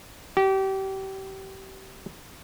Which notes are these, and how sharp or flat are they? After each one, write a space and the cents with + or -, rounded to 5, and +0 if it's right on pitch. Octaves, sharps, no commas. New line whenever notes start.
G4 -30